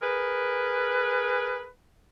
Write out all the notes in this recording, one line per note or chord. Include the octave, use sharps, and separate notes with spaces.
G#4 A#4 B4